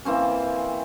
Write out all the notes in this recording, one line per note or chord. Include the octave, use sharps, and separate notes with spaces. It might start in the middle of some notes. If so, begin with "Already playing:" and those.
E3 A#3 C4 C#4